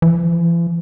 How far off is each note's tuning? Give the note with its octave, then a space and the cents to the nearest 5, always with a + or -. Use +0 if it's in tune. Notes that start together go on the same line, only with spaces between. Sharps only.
E3 +45